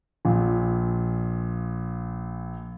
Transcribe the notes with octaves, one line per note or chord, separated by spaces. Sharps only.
A#1 A#2